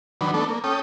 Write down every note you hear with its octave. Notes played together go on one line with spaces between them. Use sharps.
D#3 F#3 D4 B4
A3 B3 D4 A4
A#3
C#4 A4 G5 D#6